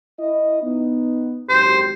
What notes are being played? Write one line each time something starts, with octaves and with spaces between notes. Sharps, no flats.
E4 D#5
B3 D#4
G#1 F#2 G4 C5